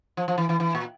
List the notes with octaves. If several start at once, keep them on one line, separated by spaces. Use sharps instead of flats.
F3
F3
E3
E3
E3
A#2